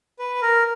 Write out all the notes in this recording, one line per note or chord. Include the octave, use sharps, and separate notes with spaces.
B4
A#4